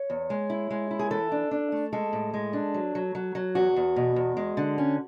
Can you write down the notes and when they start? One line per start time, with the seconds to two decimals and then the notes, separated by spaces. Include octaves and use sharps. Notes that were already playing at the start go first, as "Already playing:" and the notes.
Already playing: C#5
0.10 E2
0.30 G#3
0.50 E4
0.70 G#3
0.91 E4
0.99 G#4
1.11 E3 A4
1.32 D4
1.51 D4
1.72 A3
1.93 G#3 A4
2.13 A2
2.34 G#3
2.53 D4
2.74 F#3
2.95 F#3
3.15 F#3
3.35 F#3
3.55 E2 F#4
3.76 E2
3.96 B2
4.16 E2
4.37 G#3
4.57 D3
4.78 C#4